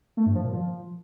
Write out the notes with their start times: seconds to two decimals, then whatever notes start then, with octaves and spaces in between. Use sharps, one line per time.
0.17 A3
0.26 G2
0.35 F3
0.44 A#2
0.53 F3